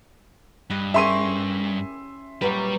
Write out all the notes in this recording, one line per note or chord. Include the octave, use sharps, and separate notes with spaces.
G2 B4 D#5
C#4 E4 G4 G#4 A#4 E5 C6 D#7
A#2 F#3 G3 A#4 B4